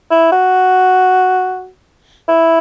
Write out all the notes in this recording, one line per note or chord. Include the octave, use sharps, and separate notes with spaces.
E4
F#4
E4